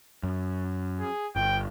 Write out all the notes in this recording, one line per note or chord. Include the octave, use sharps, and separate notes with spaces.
F#2
G#4
G1 G5